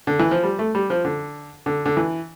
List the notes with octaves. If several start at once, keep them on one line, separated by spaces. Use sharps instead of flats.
D3
E3
F3
G3
A3
G3
F3
D3
D3
D3
E3